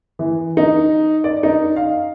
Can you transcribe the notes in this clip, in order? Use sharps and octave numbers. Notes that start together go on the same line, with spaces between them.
E3
D#4
D5
D#4
F5